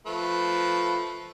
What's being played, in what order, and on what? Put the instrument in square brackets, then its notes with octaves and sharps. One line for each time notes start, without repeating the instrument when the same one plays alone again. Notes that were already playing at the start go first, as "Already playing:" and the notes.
[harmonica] F3 A3 B4